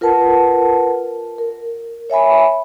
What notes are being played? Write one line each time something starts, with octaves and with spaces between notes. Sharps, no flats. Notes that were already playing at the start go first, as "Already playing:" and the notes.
F4 A#4 B4 F#5 A5
A#4
C#5 E5 G#5 B5